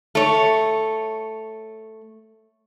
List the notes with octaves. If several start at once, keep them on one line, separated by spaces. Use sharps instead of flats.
A3 C#5